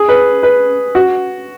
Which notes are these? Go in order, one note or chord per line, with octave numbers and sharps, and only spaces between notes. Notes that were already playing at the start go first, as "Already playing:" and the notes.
Already playing: G#4
B4
B4
F#4